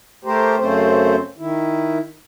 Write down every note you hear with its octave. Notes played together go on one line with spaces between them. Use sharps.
A3 G4 A#4 C5
F#2 C#3 A3 C4 C5
D#3 E4